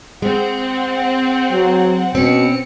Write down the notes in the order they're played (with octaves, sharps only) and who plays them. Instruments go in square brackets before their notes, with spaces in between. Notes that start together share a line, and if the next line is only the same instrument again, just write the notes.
[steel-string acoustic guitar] G#3 [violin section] C4 F#5
[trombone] F#3
[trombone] B2 [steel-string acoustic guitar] C4 C#4 [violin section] C#7